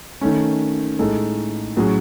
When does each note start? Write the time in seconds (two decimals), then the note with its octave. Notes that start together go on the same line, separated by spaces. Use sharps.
0.21 D#3 A3 C#4
0.99 A2 G#3 D#4 A4
1.76 A2 F#3 C#4 G#4